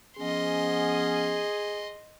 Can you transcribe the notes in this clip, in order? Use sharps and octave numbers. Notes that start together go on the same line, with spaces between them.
F3 B3 C#4 G#4 D#5 C6